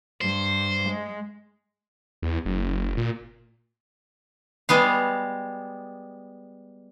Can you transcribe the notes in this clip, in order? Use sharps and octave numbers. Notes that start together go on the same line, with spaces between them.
G2 C5
G#3
E2
F#1
F#1
A#2
G3 G#3 B3 F5